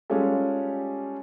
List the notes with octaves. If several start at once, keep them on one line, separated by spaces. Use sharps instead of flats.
G3 G#3 C#4 F4 G4 A4